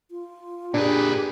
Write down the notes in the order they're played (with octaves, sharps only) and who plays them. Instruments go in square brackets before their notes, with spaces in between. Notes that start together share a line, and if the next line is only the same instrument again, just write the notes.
[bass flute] F4
[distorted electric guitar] A#2 B4 [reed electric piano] D4 [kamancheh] G4 G#4